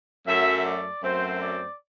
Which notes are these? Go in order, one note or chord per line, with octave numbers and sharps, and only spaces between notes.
F#2 F#3 A3 E5
D5
F#2 F#3 A3 C4 C5
D5